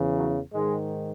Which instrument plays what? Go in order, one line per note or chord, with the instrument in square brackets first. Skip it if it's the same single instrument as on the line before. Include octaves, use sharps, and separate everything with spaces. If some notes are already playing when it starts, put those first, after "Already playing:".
Already playing: [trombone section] E2 C#3 E3
F#3
G#2 D#3 G#3